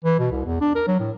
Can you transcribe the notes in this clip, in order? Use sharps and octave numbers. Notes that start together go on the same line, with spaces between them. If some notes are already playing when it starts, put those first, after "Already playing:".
E3
B2
C2
E2
D4
A#4
F#3
A2